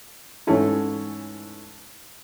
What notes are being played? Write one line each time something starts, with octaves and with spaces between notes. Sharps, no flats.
G#2 E3 A3 C#4 E4